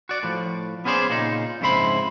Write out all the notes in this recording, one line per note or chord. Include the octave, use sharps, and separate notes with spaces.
F#4 D5
A2 F3
B3 C#4 G#4 C5 D5
A#2 C#3 D#4
F2 G#2 C#3 E4 C5 B5